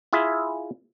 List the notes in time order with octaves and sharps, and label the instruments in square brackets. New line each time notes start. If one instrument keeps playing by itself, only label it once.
[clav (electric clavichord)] E4 F4 G#4 E5